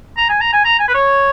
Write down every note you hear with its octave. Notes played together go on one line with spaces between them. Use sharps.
A#5
G#5
A#5
G#5
A#5
G#5
B4
C#5